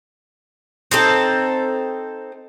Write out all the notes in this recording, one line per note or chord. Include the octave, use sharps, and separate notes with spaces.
C4 D#4 A4